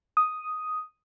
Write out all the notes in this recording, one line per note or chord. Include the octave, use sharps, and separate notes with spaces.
D#6